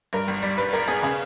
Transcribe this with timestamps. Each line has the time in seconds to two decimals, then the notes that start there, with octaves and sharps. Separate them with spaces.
0.13 G2 A#4
0.28 G1
0.43 G3
0.58 G2 B4
0.73 G1 A#4
0.88 B3 G#4
1.03 C#3 G#4